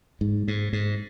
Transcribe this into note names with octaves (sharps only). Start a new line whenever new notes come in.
G#2
G#2
G#2